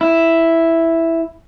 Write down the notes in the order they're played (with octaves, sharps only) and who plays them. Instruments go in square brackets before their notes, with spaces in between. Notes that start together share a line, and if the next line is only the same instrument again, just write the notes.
[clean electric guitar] E4